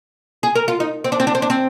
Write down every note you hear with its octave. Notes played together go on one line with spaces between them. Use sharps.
G#4
A#4
F4
D#4
C4
D4
C4
D4
C4
D4
C4